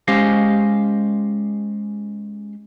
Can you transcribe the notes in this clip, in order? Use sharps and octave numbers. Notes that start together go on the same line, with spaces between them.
G#3 C#4 G4 C5 D#5 F5